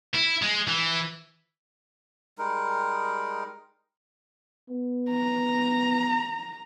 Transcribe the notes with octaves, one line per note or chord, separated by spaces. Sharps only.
E4
G#3
E3
G3 G#3 D#4 A#4
B3
A#5